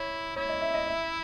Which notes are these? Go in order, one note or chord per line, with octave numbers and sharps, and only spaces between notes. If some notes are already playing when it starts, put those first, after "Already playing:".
Already playing: E4 C#5
E4 C#5
D#5
E5
D#5
E5